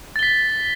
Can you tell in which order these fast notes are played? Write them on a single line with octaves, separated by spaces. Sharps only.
A6 G7 B6